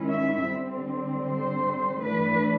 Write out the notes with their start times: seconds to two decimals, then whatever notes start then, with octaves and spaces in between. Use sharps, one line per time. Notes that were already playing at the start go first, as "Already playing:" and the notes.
Already playing: D#3 G#3 C#4 E4
0.11 E5
0.49 D3 G3 C4
1.26 C5
2.03 E3 A3 D4 B4